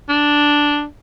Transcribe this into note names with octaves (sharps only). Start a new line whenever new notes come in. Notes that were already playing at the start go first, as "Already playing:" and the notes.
D4